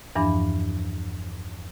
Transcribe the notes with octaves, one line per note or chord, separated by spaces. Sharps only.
E2 G2 E3 F3 D4 B5